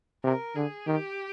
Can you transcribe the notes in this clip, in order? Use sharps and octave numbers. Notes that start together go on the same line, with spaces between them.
C3 A#4
D3 G#4
D#3 G4